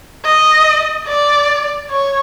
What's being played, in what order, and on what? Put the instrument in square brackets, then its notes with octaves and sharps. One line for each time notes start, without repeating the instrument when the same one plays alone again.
[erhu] D#5
D5
C#5